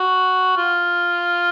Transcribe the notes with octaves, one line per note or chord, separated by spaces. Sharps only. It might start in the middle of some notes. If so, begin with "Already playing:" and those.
Already playing: F#4
F4